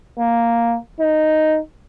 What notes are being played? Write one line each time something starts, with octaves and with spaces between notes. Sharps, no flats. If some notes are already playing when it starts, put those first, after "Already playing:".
A#3
D#4